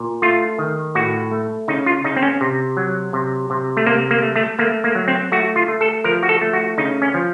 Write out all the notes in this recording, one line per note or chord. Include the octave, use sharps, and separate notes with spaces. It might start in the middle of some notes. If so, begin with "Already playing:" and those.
Already playing: A#2
A3 F4
D#3
A2 F#4
A3
C#3 D#4
F4
C#3 D#4
C4
C#4
C3
F#3
C3
C3
A3
C3 A#3
A#3
A3
A3
A3 A#3
A#3
F#3
C4
A3 F#4
F4
A3
A4
F3 A#4
F#4
A4
A3
F#4
C#3 D#4
C#4
F3